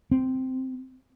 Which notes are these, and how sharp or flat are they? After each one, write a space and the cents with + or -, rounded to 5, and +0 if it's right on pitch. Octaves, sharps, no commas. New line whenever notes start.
C4 -10